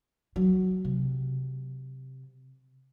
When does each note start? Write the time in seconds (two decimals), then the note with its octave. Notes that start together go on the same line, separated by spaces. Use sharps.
0.36 F#3
0.85 C3